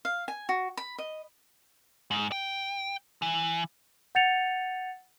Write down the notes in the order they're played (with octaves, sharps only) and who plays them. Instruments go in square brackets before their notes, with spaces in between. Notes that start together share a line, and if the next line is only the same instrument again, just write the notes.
[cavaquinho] F5
G#5
F#4
B5
D#5
[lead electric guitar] G#2
G5
E3
[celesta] F#5 G6 A6 C#7 F7